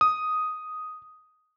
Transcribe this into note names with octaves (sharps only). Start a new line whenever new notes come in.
D#6